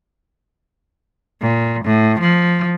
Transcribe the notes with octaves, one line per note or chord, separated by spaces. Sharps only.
A#2
A2
F3